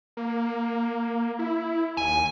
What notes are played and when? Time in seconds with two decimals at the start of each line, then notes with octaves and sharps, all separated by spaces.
0.17 A#3
1.39 E4
1.97 D#2 G#5